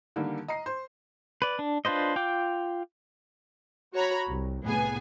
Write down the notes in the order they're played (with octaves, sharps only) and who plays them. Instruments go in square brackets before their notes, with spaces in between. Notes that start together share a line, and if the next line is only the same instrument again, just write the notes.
[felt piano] D3 D#3 G3 A#3
D#5 A#5 C7
C5
[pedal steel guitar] B4 D5
D4
D4 F4 B4 C5 D#5
F4 G5 D6
[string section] F#4 C#5 A#5 B5
C2
C2 A2 B3 G#4 G#5